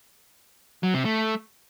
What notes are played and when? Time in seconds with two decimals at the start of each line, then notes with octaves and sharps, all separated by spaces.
0.83 F#3
0.94 C3
1.05 A3